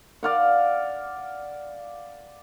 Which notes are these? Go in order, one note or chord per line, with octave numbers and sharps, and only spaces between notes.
D5 F5 F#5